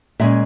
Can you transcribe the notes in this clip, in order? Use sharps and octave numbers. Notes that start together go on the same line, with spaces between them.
A#2 G#3 C#4 E5